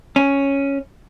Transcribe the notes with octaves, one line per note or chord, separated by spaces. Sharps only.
C#4